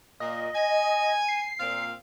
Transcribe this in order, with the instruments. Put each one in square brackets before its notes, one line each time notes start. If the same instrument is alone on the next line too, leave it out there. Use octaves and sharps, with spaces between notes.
[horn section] A#2 [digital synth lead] D#5
[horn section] G#5
[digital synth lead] C7
[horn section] A#2 C4 F5